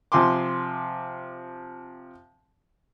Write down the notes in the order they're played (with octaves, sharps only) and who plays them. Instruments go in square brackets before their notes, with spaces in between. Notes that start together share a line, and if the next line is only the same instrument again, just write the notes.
[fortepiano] C3 F3 G#5 C6 D6